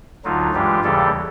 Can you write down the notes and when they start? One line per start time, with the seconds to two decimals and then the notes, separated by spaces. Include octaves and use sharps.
0.24 D2 D3 F#3 D#4 F4
0.54 G2 E3 G#3 F4 G4
0.84 D#2 C#3 E3 G3 G4 A4